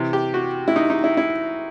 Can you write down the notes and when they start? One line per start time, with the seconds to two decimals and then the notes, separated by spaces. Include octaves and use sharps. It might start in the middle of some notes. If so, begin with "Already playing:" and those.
Already playing: C3 E3
0.13 G4
0.34 F#4
0.68 E4
0.76 D#4
0.90 D#4
1.04 E4
1.17 E4